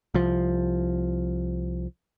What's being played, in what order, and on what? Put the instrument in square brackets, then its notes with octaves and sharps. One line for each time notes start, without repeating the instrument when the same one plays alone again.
[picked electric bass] C2 F3